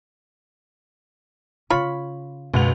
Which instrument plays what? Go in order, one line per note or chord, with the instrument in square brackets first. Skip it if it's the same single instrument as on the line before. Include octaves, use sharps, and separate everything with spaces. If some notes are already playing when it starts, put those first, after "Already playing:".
[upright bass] C#3 C#4 [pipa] F4 C#5 B5
[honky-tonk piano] C#2 F#5 F7 [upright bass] F#2 [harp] B2